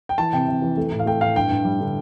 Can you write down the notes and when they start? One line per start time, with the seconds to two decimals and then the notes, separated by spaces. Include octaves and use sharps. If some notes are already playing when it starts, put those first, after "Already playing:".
0.09 G5
0.18 E3 A5
0.33 C3 G5
0.48 C3
0.62 E3
0.77 A3
0.92 A2
0.99 F5
1.06 A3 G5
1.21 A2 F5
1.36 G2 G5
1.51 G2
1.65 G3
1.81 D3